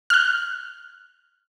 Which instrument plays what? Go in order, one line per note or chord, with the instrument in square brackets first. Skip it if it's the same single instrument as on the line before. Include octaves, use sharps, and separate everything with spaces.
[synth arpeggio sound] F6 F#6